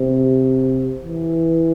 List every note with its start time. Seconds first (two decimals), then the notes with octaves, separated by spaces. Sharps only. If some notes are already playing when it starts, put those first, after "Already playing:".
Already playing: C3
1.03 E3